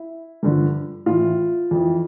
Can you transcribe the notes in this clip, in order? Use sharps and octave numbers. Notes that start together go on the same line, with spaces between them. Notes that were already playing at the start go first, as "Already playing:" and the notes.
Already playing: E4
G2 D3 F3
A2 E3 F4
F2 E3